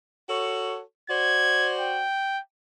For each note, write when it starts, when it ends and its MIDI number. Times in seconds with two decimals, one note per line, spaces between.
0.29 0.81 66
0.29 0.81 69
0.29 0.81 73
1.10 2.05 66
1.10 2.05 72
1.10 2.05 74
1.10 1.71 92
1.80 2.40 79